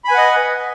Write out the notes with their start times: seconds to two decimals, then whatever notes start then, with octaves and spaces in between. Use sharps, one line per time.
0.05 B5
0.08 G#5
0.11 B4
0.15 F#5
0.18 D#5